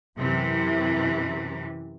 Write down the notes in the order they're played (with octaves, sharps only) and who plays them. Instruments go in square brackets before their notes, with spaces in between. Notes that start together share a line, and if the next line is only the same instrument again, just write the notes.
[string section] F#2 C3 E3